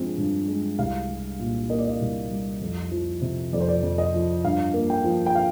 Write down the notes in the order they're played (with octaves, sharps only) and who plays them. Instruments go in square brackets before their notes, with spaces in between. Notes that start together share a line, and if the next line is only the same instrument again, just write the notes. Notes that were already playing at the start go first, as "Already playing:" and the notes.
Already playing: [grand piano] G2 F3 G#3 C4
G2
G#3
C2 F5
G3
A#2
A#3 D#5
D5
D#5
C2
G3
F2
F3
C3
F2 D5
C5
D5
F2
D#5
F3
G2 F5
A#3
G5
F3
G5
F5